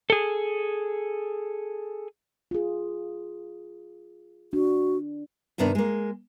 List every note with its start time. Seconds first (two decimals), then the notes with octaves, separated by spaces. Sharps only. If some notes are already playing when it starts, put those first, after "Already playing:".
0.10 G#4 A4
2.51 F4 G#4
4.53 D4 F#4
5.58 G2 C3 D#3 B3 D4
5.75 G#3 A#3